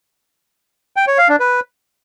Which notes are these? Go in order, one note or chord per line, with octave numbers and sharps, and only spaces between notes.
G5
C#5
F5
D4
B4